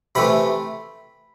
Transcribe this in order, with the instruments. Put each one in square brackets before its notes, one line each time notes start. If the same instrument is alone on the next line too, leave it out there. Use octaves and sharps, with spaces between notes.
[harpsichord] C3 E3 A3 B5